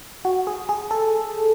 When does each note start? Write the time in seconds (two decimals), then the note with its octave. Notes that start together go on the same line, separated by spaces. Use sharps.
0.25 F#4
0.47 G#4
0.69 G#4
0.91 A4